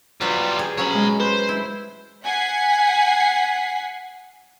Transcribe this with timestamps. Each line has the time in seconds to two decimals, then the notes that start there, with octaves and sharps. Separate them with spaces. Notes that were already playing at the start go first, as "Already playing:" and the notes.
0.21 F#3 G3 F4 B4
0.59 G#4
0.77 F#3 C#4 C#5 B5
0.94 G#3
1.20 B4 C5
1.49 E4
2.23 F#5 G#5 B6 C7